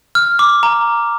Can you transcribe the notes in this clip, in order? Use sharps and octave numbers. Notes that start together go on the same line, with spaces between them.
F6
D6
A#5